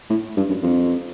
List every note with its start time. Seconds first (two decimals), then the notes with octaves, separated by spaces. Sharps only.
0.10 A2
0.37 G2
0.49 F#2
0.62 F2